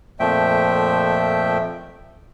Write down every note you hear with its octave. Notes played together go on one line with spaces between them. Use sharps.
F2 A#2 F3 A3 E5 G5